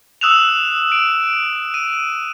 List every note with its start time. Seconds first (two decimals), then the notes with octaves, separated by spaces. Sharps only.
0.21 D#6 E6 F#6 E7 F7
0.92 D7
1.74 D#7